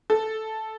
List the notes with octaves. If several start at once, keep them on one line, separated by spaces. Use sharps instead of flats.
A4